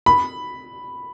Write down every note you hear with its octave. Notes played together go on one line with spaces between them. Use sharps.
B5